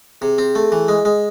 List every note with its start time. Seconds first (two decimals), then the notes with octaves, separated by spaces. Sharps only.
0.21 C3 G#4
0.38 C4
0.55 A3
0.72 E3
0.88 G#3
1.05 G#3